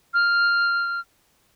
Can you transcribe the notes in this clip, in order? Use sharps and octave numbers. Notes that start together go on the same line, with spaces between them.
F6